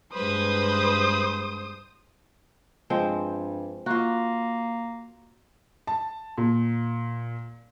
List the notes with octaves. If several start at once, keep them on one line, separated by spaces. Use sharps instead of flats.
G2 G#3 B4 C5 D#6
G2 F3 G#3 C4
A#3 F4 F#4
A5
A#2